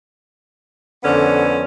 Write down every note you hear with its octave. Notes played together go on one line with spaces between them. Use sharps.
F2 D3 B3 C#4